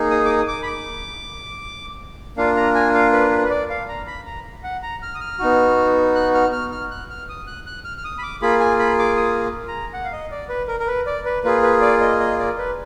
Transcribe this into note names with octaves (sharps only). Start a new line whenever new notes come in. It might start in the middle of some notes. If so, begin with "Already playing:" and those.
Already playing: A#3 D#4 G#4
D#6
D6
D#6
D6
B5
D6
A#3 D4 F4 F5
A#5
G#5
F5
B4
B4
B4
D5
F5
A#5
B5
A#5
F#5
A#5
F6
D#6
F6
B3 D#4 F#4
F#6
F6
F6
F6
F#6
F6
D#6
F#6
F#6
F6
F6
D#6
B5
D6
A#3 F4 G#4 B5
G#5
B5
D6
D#6
A#5
F#5
F5
D#5
D5
B4
A#4
A#4
B4
D5
B4
A#3 F4 G#4 B4
B4
D5
D#5
D#5
D5
B4